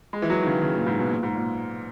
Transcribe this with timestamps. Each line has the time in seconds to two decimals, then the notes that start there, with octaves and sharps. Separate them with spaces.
0.13 G#3
0.22 E3
0.30 F#3
0.41 D#3
0.46 C#3
0.62 C#3
0.74 A#2
0.86 G#2
0.99 B2
1.11 A#2
1.23 G#2
1.35 A#2